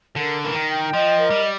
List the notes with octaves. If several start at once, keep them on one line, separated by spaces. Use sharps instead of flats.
D3 A#4
E3 A#4
D#3
G5
F3 D#5
A#4
G3